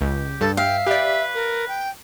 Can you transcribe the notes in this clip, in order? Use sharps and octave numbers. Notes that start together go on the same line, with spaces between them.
C#2 G4
G2 A4
E5 F5 G5
G4 B4 D5 E5
A#4
G5